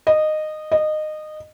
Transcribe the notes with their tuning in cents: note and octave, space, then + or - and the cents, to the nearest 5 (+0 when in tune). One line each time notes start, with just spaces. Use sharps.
D#5 -15
D#5 -20